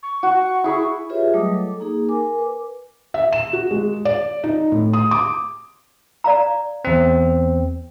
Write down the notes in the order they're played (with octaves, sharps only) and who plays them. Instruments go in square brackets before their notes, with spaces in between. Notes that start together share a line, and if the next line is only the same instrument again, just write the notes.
[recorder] C#6
[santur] F#4
E4 G#4
[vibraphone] F4 G4 G#4 B4 C#5 E5
F#3 G3 A3 D#5 D6 D#6
A4
A#3 D#4 G#4
A#4 G#5 D6
B4
[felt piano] E5
E7
F#4
G#3
D5
D#4
A2
D#6
D6
[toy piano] D5 F5 A#5
[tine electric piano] E2 C4